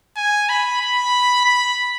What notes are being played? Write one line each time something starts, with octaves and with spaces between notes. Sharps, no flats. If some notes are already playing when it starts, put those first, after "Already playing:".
G#5
B5
B5
B5